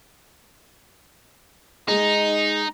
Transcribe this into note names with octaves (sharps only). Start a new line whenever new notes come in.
G#3 D#4 G#4